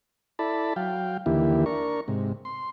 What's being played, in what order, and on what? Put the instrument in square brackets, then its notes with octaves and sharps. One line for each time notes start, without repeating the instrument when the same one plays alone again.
[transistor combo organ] E4 A4 D5 A5 B5
F#3 F5 G5
D#2 D3 E3 A#3 E4 G4
D4 A#4 C#6
G#2 C3
C6